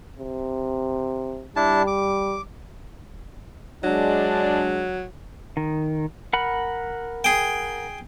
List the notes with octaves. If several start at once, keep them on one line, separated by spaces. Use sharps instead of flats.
C3
G3 D4 E4 A5
D6
F#3 G#3 D4
D#3
A#4 F#5 B5
G#4 G5